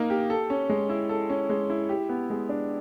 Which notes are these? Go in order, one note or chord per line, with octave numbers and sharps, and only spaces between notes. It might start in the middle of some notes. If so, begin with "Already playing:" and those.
Already playing: A#3 D#4 A#4
G4
A4
C#4
G#3
E4
A4
C#4
G#3
E4
G4
B3
G#3
D4